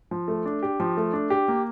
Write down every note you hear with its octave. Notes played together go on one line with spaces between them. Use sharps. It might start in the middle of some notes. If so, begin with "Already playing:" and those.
F3
A3
D4
G4
F3
A3
D4
G4
A#3